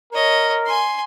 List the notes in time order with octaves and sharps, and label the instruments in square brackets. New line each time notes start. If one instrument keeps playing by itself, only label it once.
[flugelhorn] A#4 [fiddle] C#5 D#5
[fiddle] G#5 C6